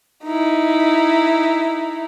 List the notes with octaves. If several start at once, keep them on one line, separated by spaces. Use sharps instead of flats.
D#4 E4